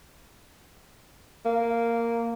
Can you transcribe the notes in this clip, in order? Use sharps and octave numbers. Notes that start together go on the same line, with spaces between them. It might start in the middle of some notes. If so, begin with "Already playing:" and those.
A#3